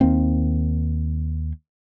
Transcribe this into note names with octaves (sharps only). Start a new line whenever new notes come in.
D#2 D#3 A#3 C4